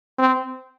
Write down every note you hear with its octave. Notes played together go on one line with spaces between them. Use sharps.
C4